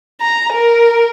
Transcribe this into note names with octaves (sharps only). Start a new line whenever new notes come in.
A#5
A#4